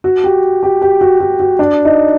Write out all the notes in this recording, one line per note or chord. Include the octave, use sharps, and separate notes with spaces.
F#4
G4
G4
G4
F#4
F#4
F#4
D4
D#4